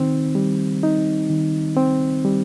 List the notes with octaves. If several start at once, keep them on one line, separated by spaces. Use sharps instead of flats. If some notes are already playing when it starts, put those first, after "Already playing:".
Already playing: D#3 C4 D#4
G3
D#4
D#3
C4
G3